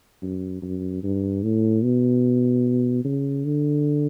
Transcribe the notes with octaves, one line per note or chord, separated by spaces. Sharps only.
F#2
F#2
G2
A2
B2
C#3
D3